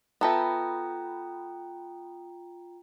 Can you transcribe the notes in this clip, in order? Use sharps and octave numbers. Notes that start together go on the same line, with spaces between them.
B3 F4 A4 E5 G5 A#5